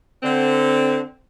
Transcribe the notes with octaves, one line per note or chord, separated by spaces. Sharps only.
D3 C4